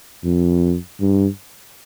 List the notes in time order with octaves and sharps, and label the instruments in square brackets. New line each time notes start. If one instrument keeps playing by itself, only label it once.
[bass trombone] F2
G2